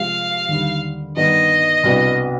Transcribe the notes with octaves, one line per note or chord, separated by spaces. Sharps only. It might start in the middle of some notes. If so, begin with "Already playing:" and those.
Already playing: C3 F3 G#3 F5
D#2 D3 G3
G2 D#3 B3 D4 D#5
C2 B2 B3 D4